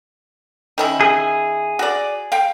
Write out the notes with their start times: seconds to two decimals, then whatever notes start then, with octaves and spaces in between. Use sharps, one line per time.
0.78 D#3 C#4 E4
1.01 G#4
1.79 F#4 D5
2.32 F5 G5